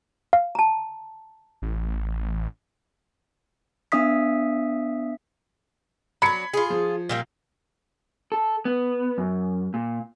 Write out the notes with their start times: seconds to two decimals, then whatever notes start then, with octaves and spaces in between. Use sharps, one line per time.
0.33 F5
0.55 A5 A#5
1.62 A1
3.92 B3 D4 E5 D#6 B6
6.22 F#3 D4 B5 G#6 C#7
6.54 F4 G#4
6.70 F3
7.09 A#2 G3 A#3
8.32 A4
8.65 B3
9.18 F#2
9.74 A#2